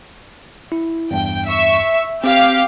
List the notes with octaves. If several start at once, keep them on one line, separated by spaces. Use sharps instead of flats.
E4
E2 G2 G5
E5 C#6
C4 G4 F5